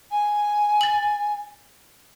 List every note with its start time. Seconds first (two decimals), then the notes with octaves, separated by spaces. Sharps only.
0.11 G#5
0.81 A6 F#7